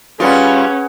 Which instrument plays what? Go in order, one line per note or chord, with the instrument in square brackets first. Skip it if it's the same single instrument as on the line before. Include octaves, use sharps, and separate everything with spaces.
[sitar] G3 F4 [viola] C#4 [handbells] G#4 B4 F#5